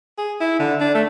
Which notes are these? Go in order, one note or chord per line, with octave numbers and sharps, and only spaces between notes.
G#4
E4
D3
D4
A3